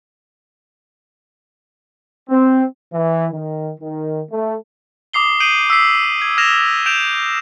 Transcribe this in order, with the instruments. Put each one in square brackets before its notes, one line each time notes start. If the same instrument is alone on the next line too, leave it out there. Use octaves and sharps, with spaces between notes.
[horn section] C4
[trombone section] E3
D#3
D#3
A3
[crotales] D6 D#6 C7 G7
D#6 G6 C7 D7 D#7 F#7
E6 B6 C7
G#6
F6 G#6 A#6 E7 F7
G6 D7 E7 F7